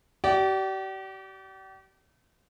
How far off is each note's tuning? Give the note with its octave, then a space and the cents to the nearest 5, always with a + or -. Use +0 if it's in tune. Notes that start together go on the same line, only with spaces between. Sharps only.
G4 -40 D5 -10